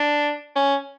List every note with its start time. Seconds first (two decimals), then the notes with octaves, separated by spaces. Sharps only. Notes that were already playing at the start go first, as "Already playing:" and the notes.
Already playing: D4
0.56 C#4